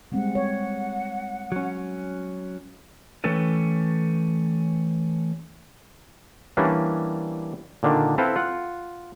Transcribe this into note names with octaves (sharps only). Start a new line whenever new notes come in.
G3 G#3 C4 F#5
C#5
F#3 C#4
E3 A3 C#4 G4 A4 B4
E3 G3 A#3 C#4 D4
A#2 D3 D#3 D4
C4 E4 A4 B4 C5 F5
F4 F#5